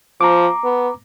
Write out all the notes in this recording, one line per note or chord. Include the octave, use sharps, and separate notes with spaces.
F3 A#5 D6
B3